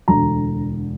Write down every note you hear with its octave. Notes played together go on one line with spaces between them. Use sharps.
E1 D2 D3 A#5